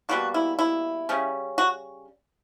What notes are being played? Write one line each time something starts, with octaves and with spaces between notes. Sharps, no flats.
B2 G3 A#3 F#4
E4
E4
C#3 G3 C#4
F#4